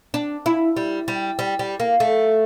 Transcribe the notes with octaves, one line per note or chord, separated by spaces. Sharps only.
D4
E4
G3
G3
G3
G3
A#3
A3